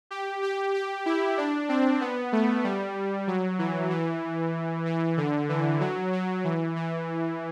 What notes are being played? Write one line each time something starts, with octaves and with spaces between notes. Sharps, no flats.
G4
G4
G4
E4
D4
C4
B3
A3
G3
F#3
E3
E3
E3
D3
E3
F#3
F#3
E3
E3